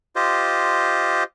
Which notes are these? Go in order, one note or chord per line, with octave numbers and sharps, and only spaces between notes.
F4 G4 C5 D#5